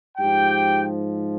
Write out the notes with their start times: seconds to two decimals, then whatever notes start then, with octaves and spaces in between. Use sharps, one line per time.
0.17 G#2 F3 G4 G5